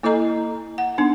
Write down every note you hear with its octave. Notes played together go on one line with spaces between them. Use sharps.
A#3 E4 A4 D#5 A#5
F#5
B3 D4 D#4